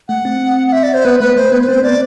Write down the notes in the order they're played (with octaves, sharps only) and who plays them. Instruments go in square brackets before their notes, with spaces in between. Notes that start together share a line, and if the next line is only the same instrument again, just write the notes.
[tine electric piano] A3 [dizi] F#5
[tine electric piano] C4
[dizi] F#5
E5
D5
C5
[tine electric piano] B3 [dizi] B4
[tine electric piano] A3 [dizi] B4
[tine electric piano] A3 [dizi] C5
[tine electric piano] B3 [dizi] B4
[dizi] B4
[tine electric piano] C4 [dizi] C5
[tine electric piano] B3 [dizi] D5